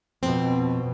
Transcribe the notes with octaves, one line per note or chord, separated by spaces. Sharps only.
F2 B2 C4